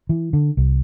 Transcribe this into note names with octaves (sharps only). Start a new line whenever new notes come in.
E3
D3
C2